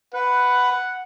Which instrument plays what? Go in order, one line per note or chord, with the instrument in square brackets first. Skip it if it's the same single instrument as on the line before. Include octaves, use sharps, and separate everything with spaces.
[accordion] B4 [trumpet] F#5